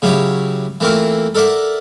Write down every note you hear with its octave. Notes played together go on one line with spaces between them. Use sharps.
C#3 F#3 E4 G4 C#5
E3 A3 A#3 C4 E4 F4
A4 A#4 D5 E5 F#5